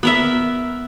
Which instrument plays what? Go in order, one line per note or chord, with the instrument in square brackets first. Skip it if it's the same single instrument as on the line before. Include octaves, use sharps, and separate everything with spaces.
[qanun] B3 A#4 E5